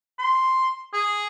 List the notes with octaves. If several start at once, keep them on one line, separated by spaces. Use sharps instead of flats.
C6
G#4